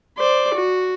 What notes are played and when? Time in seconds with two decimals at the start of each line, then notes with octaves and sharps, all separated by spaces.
0.18 C5 D5
0.55 F#4